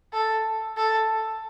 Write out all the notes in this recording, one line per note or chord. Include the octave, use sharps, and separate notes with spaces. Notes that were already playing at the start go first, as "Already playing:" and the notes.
A4
A4